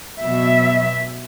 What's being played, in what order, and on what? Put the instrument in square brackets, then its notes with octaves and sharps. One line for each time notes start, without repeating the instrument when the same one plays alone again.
[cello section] B2 F#3 E5